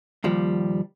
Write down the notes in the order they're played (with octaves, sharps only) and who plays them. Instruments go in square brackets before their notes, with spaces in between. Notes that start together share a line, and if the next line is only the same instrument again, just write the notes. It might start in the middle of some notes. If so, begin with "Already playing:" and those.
[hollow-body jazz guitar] D#2 F3 G3